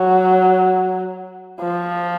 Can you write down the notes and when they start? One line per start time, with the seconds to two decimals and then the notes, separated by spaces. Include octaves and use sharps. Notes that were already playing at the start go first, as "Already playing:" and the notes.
Already playing: F#3
1.60 F3